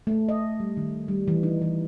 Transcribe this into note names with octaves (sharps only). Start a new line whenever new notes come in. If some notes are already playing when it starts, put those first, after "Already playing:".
A3
D#5
G3
D#3
G3
E3
D#4
E3